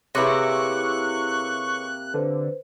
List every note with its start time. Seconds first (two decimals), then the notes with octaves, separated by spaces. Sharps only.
0.15 C3 A#3 E4 G#4 B4 C#5 C#6 F#6
2.14 D3 B4 C5